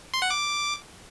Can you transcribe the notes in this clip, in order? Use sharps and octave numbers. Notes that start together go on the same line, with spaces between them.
C6
F#5
D6